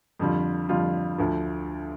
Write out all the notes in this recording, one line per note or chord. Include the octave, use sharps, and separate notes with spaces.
F2 D3 G3 F4
F2 D3 G3 F4
D2 D3 F3